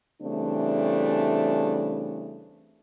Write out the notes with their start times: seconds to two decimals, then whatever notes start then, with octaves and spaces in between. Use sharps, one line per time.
0.22 C#3 E3 G3 A3 C4 D4